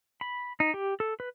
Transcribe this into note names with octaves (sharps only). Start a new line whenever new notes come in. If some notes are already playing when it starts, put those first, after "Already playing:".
B5
D#4
G4
A4
B4